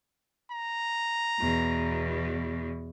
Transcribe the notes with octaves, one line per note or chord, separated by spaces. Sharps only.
A#5
E2 B2